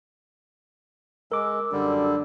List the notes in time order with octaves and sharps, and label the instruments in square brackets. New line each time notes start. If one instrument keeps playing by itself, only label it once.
[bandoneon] G#3 [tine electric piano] A#4 D6 [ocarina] E6
[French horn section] F#2 F#3 D4 [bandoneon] D3 G3